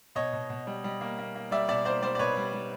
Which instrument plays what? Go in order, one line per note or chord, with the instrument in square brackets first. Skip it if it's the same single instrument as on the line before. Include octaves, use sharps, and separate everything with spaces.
[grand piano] B2 C#5 D#5
B2
B2
G3
G3
A#3
A#3
A#3
G3 D5 E5
B2 D5 E5
A#3 C5 D5
G3 C5 D5
D5
B2 B4 C#5
G3
G3